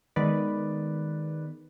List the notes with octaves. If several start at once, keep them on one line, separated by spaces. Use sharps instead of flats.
D#3 G#3 B3 B4 D5